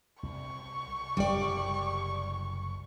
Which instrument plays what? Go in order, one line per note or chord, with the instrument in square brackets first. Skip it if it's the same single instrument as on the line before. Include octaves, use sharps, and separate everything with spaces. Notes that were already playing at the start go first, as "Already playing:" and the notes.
[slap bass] C2 [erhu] C#6
[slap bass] F#1 C2 [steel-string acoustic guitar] G3 D5